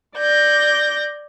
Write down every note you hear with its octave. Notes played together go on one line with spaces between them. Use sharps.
D5 G6 A#6